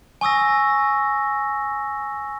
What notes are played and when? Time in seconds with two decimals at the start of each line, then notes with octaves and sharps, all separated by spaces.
0.21 G#5 C#6 D#6 E6 A#6